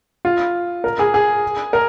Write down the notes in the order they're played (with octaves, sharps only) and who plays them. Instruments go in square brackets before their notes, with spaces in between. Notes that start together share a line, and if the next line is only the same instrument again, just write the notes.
[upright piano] F4
A#4
G#4
G#4
A#4